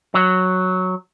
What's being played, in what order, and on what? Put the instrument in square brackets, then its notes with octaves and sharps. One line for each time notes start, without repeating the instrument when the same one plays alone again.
[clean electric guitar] F#3